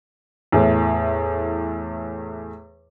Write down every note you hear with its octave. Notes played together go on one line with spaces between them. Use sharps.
E2 A2